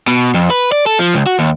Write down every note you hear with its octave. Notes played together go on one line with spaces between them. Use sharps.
B2
F2
B4
D5
A4
F3
C#2
F#4
D#2